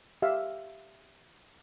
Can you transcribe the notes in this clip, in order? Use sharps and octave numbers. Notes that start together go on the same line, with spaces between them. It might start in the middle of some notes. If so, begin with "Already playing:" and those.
G4 E5 F5